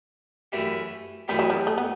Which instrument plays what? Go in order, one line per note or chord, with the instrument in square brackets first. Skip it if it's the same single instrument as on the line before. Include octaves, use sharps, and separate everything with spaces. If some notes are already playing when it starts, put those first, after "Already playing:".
[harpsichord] F#2 E3 A3 E4 G4
[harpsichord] F#2 E3 A3 E4 G4 [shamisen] G3
[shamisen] F#3
G3
A3
B3